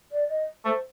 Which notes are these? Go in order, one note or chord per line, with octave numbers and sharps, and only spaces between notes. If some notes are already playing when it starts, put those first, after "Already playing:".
D5
D#5
A3 C5